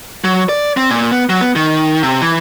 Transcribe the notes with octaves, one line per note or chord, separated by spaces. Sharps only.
F#3
D5
C4
A#2
B3
F#3
B3
D#3
C3
E3